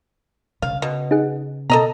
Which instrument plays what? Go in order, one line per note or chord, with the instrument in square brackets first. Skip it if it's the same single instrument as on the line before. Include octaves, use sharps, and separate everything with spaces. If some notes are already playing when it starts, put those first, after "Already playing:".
[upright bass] C#3 [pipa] F5
[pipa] B2
[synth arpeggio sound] D#4 G#4 F#5
[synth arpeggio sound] B2 [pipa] A4 D#5 A#5